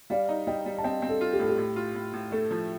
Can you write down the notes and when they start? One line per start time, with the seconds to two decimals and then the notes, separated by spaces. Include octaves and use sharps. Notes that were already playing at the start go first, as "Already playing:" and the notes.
0.10 G3 D5 F5
0.29 D#4
0.47 G3 D#5 G5
0.66 G3
0.78 A5
0.84 C4 D#5 G5
1.02 C4
1.09 A4
1.21 F4
1.33 G4
1.39 A2 A4
1.49 G4
1.58 A2
1.76 F4
1.95 A2
2.13 A2
2.32 A3 A4
2.51 F3